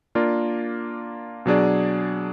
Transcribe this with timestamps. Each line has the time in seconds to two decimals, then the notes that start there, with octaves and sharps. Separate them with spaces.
0.15 A#3 D4 F4 A#4 D5
1.46 B2 F#3 D4 G#4 D5